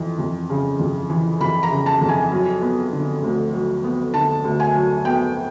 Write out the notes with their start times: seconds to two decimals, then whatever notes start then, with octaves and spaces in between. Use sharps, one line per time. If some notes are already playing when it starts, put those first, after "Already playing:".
Already playing: F2 E3
0.19 F2
0.50 C#3
0.80 F2
1.10 E3
1.41 F2 B5
1.63 A#5
1.71 C#3
1.86 A5
2.01 F2
2.09 G#5
2.32 F#3
2.62 B3
2.92 D3
3.22 D2
3.53 F#3
3.84 B3
4.14 D3 A5
4.44 D2
4.60 G#5
4.75 F#3
5.05 B3 G5